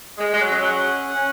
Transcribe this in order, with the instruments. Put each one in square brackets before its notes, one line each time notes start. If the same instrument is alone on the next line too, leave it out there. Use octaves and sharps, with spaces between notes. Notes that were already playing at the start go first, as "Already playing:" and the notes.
[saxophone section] G#3 [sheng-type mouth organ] G#4
[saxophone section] G#3
F#3
[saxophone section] G#3 [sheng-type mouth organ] C#4
[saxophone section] F#3
[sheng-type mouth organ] F#5
C#4